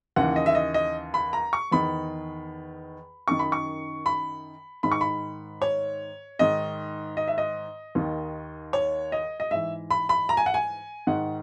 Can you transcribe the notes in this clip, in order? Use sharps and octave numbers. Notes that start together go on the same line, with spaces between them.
D#2 C#3 E3 F#5
D#5
E5
D#5
D#5
B5
A#5
C#6
E2 D#3 B5
F#2 D#3 C#6
B5
C#6
B5
G#2 D#3 B5
C#6
B5
C#5
G#2 D#3 D#5
D#5
E5
D#5
D#2 D#3
C#5
D#5
D#5
G#2 E3 E5
B5
B5
A#5
G#5
F#5
G#5
G#2 D#3 F#5